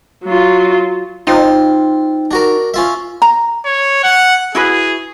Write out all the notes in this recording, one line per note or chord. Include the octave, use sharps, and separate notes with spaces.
F#3 F4
C4 D#4 F4
D4 F#4 A#4
C#4 F4 E5
A#5
C#5
F#5
E4 F#4 G#4 B4